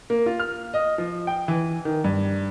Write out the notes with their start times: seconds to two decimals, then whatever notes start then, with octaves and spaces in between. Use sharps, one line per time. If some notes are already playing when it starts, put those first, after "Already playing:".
0.10 A#3
0.26 F4
0.40 F6
0.74 D#5
0.98 F3
1.27 G5
1.48 E3
1.85 D#3
2.04 G2